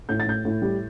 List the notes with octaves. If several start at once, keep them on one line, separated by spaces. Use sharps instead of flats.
A2 G6
A6
A2 G6
A2
G3